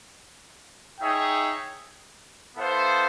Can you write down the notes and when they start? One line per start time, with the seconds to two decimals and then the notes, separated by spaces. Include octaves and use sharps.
1.00 D#4 G#4 C#5 E5 G5
2.56 B3 E4 A4 C5 F5